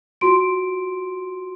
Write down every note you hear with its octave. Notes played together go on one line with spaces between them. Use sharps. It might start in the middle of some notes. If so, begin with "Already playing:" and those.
F4 F#4 C6 D7